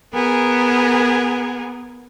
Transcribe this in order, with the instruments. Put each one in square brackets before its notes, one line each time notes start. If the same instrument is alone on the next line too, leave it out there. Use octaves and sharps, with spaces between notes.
[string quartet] B3 G#4 A#4